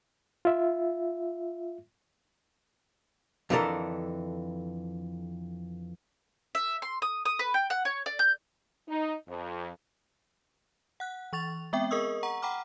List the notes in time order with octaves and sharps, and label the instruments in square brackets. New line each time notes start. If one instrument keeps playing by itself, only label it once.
[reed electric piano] F4 E5
[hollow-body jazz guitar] F2 D3 E3 D#4 A4 A#4
[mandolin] E5
C6
D#6
D#6
B4
G5
F#5
C#5
D5
G6
[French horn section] D#4
F2
[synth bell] F#5 F#6
E3 C#6 A6 F7
G#3 B3 C4 E5 G5
G#4 A#4 D#5 C#6 D#6 E6
F#5 A#5 C#6
F#5 G5 A#5 B5 D6 F6